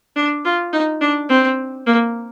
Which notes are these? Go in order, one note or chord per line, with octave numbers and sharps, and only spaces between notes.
D4
F4
D#4
D4
C4
A#3